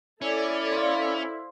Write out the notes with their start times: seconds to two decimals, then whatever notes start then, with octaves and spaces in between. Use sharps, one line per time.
0.22 C#4 E4 A4 D5
0.72 C5 F5